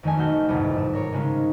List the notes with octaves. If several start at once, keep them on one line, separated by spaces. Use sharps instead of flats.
F2 D#3 A3 C#4 D#5 G#5
B1 A3 F#4 F6 G6
G1 C2 F2 G#2
B1 E7
A#4 C#5
C#3 G#3 C4 C#4 D#4